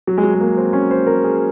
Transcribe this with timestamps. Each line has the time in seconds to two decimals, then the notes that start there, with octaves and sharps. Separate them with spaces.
0.07 F#3
0.18 G#3
0.23 F#3
0.34 G#3
0.41 A#3
0.57 C4
0.73 C#4
0.91 C5
1.07 A#4
1.24 G#4